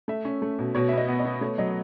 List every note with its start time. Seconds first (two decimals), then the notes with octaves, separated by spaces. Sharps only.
0.08 A3 E5
0.25 C#4
0.42 A3
0.59 B2
0.75 B2 C#5
0.89 E5
0.92 B3 D#5
1.08 B3
1.19 D#5
1.25 B3
1.41 A3 C#5
1.58 F#3 D#5